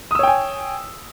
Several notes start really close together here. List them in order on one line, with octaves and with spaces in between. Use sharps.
D#6 E6 C#5 G5 G#5